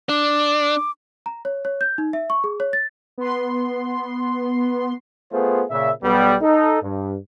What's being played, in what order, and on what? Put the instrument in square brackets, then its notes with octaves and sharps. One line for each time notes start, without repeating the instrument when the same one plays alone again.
[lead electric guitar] D4 [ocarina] D6
[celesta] A#5
C#5
C#5
G6
D#4
E5
C#6
G#4
C#5
A6
[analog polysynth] B3 C6
[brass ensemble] A3 B3 F4 G#4 C5
A#2 C#3 E5
B1 G3 B3
D#4 A4
G2